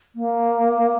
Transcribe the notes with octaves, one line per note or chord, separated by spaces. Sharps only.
A#3